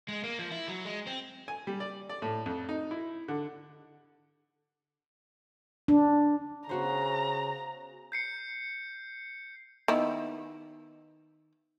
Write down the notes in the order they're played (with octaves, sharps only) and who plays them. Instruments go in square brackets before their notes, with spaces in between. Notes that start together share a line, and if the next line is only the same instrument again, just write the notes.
[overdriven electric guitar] G#3
A#3
F3
E4
F#3
G#3
C4
[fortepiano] G#5
G3
D5
D5
A2
F2
D#4
E4
D3
[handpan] D4
[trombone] C#3 [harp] B3 F#4 C5 [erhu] A#5
[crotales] G6 C7 C#7
[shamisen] D#3 B3 E4